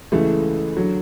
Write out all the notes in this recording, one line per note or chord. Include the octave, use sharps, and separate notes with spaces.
C#2 C#3 E3 A3
D3 F#3